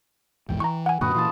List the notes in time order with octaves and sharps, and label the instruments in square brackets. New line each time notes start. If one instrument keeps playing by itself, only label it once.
[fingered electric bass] A#1 E2 G#2 [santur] G5
[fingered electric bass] E3 [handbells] A#5 C#6
[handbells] F#5 G#5
[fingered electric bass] F#2 A#2 D3 [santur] F#4 B4 D#6
[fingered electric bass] A#2 E3 [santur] F4 A5